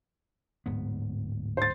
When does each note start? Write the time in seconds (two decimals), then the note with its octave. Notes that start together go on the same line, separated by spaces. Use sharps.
0.66 D1 G#2 B3
1.57 C5 A6